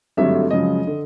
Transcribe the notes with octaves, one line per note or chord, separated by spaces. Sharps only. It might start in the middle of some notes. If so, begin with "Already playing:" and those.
G#1 G2 D3 F#3 A3 E5
F#2 C#3 F3 G#3 D#5
D3